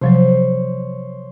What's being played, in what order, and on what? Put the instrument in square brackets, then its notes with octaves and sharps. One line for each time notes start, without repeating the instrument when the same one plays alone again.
[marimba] C3 F3 F#3 [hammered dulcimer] C5 C#5